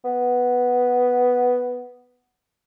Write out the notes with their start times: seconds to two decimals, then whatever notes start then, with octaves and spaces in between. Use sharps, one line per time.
0.04 B3